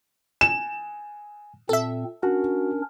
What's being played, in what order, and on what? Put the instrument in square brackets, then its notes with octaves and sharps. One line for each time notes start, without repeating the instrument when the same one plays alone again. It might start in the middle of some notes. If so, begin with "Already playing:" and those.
[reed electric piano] G#5 [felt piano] E7
[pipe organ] A#2 C4 [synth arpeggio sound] A4 E5
[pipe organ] C#4 D4 A#4 [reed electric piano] F#4